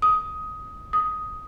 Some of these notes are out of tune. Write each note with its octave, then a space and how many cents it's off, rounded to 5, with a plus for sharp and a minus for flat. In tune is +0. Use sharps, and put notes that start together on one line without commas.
D#6 +15
D#6 +5